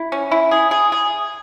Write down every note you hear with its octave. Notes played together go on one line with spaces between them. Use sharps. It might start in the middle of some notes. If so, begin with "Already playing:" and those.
Already playing: E4
C#4
E4
G#4
G#4
G#4